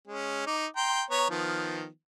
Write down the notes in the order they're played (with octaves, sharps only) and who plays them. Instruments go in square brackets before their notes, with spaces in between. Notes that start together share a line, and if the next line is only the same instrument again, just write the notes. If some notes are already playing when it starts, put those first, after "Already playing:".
[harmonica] G#3 C#4
D#4 D6
G5 A#5 C6
B3 C#5 A#5
D#3 F3 B3